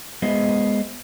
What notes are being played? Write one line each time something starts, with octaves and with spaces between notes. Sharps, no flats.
G#3 B3 G#4 C5 D#5 E5